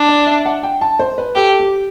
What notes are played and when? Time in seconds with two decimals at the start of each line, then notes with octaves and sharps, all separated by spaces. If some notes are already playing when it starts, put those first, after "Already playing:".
Already playing: D4
0.08 D5
0.26 E5
0.46 F#5
0.63 G5
0.81 A5
0.99 C5
1.18 B4
1.36 G4 A4
1.60 G4